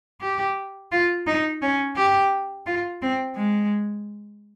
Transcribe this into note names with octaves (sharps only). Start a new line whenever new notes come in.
G4
F4
D#4
C#4
G4
F4
C4
G#3